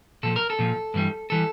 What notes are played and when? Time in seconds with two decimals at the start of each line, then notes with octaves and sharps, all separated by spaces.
0.23 A#2 F3 A4
0.36 A#4
0.50 A4
0.59 A#2 F3
0.94 G2 E3 G3
1.30 E3 G3 A4